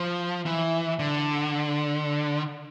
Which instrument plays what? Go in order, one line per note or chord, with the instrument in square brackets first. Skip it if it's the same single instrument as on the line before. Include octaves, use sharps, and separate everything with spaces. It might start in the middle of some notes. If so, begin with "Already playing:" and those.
Already playing: [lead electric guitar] F3
E3
D3